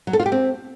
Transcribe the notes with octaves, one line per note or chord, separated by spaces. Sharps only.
F#3
A4
F4
G4
C4